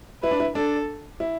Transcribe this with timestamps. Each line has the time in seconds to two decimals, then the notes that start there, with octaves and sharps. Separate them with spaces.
0.23 E4 B4
0.31 D4
0.40 E4
0.55 D4 A4
1.20 E4